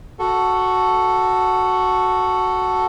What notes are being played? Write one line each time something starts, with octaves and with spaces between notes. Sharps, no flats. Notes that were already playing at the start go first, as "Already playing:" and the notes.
F#4 A4